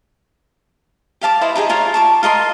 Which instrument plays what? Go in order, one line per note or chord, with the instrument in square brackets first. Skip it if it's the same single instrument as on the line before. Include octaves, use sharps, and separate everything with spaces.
[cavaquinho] G4 F5 A5 D6
E4 B4 C5 D#5
D#4 G4 G#4 G#5
F4 A#4 C#5
A5 C#6 D6
F4 A#4 D#5 C6